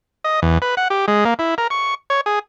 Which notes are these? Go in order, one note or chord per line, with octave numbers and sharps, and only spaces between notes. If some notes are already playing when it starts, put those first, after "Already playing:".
D#5
E2
B4
F#5
G4
G#3
A#3
E4
A#4
C#6
C#5
G#4